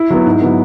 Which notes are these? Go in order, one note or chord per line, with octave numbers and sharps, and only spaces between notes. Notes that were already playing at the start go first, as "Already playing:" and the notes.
Already playing: E4
F#3 B3
G#2
F#3 B3